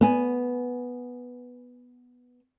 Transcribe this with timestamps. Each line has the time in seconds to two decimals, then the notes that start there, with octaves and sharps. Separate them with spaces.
0.01 B3 G#5